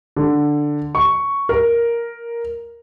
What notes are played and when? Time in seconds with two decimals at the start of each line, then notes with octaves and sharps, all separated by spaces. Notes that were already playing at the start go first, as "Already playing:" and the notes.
0.17 D3
0.95 C#6
1.49 A#4